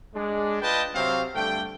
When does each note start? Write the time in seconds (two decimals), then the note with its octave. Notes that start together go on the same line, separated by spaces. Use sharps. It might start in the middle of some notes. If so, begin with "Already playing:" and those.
0.15 G#3 D4
0.62 D4 F4 B4 D#5 G5 A5
0.95 C3 F#3 C4 C5 E5 F5
1.35 G2 D3 A3 G5